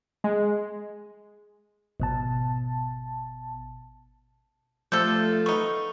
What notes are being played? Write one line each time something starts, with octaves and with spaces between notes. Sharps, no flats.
G#3
G#1 B2 A5
C3 F3 G3 A3 A4 G6
B3 D#4 C#6